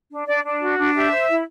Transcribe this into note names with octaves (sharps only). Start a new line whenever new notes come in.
D4
D4 D5
D4
F#4
D4
G4 E5
C5
E4